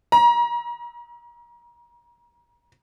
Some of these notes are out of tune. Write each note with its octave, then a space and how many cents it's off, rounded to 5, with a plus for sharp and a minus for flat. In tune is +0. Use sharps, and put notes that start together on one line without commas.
A#5 +35